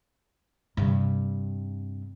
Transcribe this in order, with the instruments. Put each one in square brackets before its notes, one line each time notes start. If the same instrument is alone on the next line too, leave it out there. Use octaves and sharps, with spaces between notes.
[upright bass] G2 C3